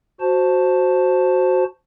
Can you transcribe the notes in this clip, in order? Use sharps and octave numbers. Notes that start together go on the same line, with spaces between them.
F#4 C5 A5